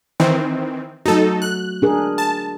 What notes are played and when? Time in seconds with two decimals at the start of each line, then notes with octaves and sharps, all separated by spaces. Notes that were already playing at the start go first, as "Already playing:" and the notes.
0.20 D#3 E3 C4
1.06 F#3 A3 D#4 F#4 A4
1.42 F#6
1.82 D4 G#4 A#4
2.18 A5